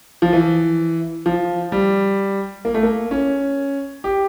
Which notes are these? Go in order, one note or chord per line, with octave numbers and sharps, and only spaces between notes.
F3
E3
F3
G3
A#3
A3
A#3
C#4
G4